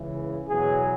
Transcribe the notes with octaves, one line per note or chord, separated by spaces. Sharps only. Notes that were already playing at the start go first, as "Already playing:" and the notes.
Already playing: C#2 C#3 E3
E2 B2 F#3 G#4